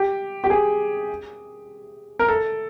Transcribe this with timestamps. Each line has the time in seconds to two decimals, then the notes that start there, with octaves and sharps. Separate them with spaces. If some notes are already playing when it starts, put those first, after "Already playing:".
Already playing: G4
0.44 G4
0.50 G#4
2.19 A#4
2.28 A4